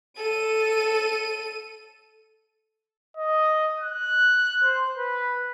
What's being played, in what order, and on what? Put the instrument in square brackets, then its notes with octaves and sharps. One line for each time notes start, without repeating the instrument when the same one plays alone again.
[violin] A4 D#7
[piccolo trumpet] D#5
F#6
C5
B4